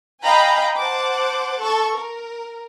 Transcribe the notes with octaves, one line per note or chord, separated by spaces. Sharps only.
D#5 F5 G5 G#5 A#5 B5
C5 F#5 A5 D6
A4 C#6
A#4